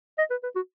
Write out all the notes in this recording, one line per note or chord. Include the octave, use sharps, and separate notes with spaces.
D#5
B4
B4
F#4